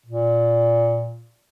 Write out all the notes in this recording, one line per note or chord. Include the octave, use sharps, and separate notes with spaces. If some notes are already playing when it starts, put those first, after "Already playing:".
A#2